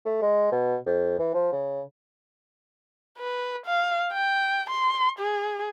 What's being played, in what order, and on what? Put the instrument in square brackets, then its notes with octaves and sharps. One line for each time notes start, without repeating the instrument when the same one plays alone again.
[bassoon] A3
G#3
B2
F2
E3
F3
C#3
[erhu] B4
F5
G5
C6
G#4